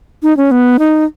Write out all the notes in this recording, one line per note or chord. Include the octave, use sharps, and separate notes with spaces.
D#4
C#4
B3
D#4